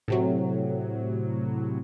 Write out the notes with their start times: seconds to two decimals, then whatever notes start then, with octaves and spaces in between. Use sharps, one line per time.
0.08 A2 C3 F#3